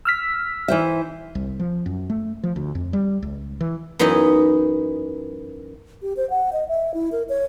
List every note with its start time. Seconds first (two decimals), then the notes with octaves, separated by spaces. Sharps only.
0.05 E6 F6 B6
0.68 E3 C5 E5
1.35 C2
1.59 F3
1.86 F#2
2.10 A3
2.43 F3
2.56 D2
2.75 F2
2.93 G3
3.22 C#2
3.61 E3
3.99 F#2 E3 B3 D#4 E4 D#5
6.02 G4
6.17 C5
6.30 F#5
6.53 D#5
6.68 E5
6.94 E4
7.12 A#4
7.29 C#5